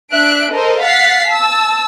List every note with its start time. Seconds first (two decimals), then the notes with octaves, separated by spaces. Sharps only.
0.12 D4 E5 F#6 D7
0.51 A4 A#4 C5 D#5
0.82 F5 F#5 A6 B6 C7
1.31 A5 E6